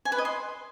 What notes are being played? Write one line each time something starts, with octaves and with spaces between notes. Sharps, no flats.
G#5
B4
D#5
C6